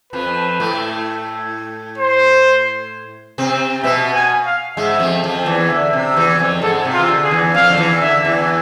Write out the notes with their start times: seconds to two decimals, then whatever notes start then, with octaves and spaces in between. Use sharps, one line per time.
0.13 F2 F3 B4
0.60 A2 A3
1.98 C5
3.38 C3 C4
3.83 B2 B3 E5
4.15 G#5
4.46 F5
4.77 G#2 G#3 E5
4.99 F2 F3
5.24 F2 F3
5.46 E2 E3
5.70 D3 E5
5.93 C3
6.16 E2 E3
6.39 F2 F3
6.62 G#2 G#3 A4
6.85 C3
6.94 F4
6.98 E3
7.09 D3
7.24 G#4
7.31 E2 E3
7.54 F2 F3 F5
7.69 D3
7.78 E2 E3
8.01 D3 E5
8.25 E2 E3